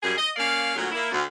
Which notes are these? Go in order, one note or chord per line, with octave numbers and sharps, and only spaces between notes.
F#2 G3 G#4
D#5
A#3 C#4 D5 F5
D2 A#2 F#3
A#3 E4
D2